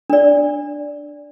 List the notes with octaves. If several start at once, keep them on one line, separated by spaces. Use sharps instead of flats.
D4 D5